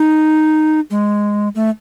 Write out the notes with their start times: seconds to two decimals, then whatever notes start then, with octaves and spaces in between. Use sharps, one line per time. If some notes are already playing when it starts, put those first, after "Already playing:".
Already playing: D#4
0.90 G#3
1.55 A3